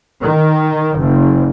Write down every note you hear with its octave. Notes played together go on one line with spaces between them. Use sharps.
D#3
F#1